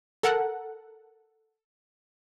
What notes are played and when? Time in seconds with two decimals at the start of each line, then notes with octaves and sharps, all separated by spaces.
0.23 A4 A#4 F#5